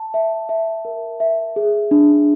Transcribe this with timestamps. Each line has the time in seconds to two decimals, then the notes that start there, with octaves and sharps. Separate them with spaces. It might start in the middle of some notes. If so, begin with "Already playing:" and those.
Already playing: A5
0.14 E5
0.49 E5
0.85 A#4
1.20 E5
1.56 G#4
1.91 D4